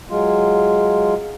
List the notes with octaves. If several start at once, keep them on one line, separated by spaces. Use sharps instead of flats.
F#3 G#3 F4